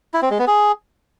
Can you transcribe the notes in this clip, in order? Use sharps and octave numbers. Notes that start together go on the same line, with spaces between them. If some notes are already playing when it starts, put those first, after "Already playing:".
E4
C4
G#3
B3
G#4